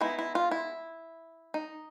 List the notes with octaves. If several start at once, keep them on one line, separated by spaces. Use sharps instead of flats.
G#3 B3 D#4 E4
E4
F4
E4
D#4